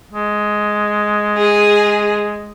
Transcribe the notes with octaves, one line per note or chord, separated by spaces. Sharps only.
G#3
G#4